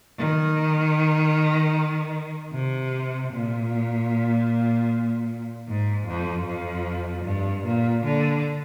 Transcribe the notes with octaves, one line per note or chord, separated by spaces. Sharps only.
D#3
C3
A#2
G#2
F2
F2
G2
A#2
D3